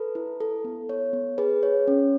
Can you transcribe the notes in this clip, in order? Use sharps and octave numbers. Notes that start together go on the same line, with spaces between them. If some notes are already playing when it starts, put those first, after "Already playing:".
Already playing: A4 B4
E4
A4
B3
B3 C#5
B3
G#4 B4
G#4 C#5
C#4